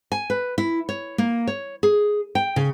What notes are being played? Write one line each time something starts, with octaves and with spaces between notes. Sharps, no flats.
G#5
B4
E4
C#5
A#3
C#5
G#4
G5
C#3